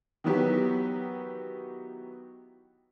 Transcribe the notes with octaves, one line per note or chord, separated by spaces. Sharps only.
D#3 E3 F#3 B3 F#4 G4